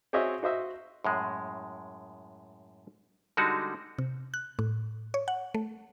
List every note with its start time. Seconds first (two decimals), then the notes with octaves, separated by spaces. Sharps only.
0.13 C4 F#4 G#4 C#5 D#5 E5
0.43 F#4 C5 D#5 E5
1.04 F#2 A2 G#3
3.37 D3 G3 G#3 D#4 F#4
3.99 C3
4.34 F#6
4.59 A2
5.14 C#5
5.28 F#5
5.54 A3